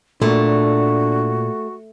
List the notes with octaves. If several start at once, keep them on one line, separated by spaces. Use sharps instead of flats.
A#2 A3 D4 F#4